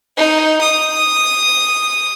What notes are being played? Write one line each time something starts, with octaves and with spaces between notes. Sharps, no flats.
D#4
D#6